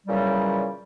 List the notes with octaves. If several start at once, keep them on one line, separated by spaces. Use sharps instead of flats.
A#2 C#3 E3 F#3 G3